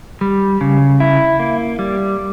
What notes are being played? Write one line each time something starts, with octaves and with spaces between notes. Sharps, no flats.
G3
C#3
E4
A#3
G3